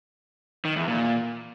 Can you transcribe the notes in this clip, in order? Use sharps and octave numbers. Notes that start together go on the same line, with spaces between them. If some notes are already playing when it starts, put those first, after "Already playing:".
D#3
E2
A#2